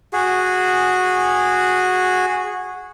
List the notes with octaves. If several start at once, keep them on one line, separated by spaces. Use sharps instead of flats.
F#4 G#4